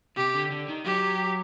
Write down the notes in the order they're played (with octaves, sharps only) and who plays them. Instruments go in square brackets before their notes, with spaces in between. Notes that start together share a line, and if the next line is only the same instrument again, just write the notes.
[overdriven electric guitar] C3 [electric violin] G4
[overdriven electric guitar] D3
D3
D#3
[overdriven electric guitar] F#3 [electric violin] G4